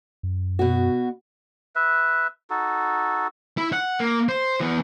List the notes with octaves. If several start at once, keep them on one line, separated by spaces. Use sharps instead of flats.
F#2
B2 F#4
B4 E5
D#4 F#4 A4
E4
F#5
A#3
C5
E3 B3